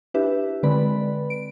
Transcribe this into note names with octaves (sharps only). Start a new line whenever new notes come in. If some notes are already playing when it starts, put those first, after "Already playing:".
D4 E4 G4 B4 E5
D3 G#3 C4 B4 D5 B5
D7